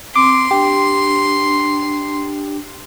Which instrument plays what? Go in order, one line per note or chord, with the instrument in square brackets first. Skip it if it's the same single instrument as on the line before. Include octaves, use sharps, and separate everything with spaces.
[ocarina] C4 [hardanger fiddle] C6 [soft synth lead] D6
[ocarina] D4 [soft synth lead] G4